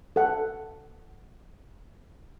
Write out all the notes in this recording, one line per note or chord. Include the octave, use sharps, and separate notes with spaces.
A4 F#5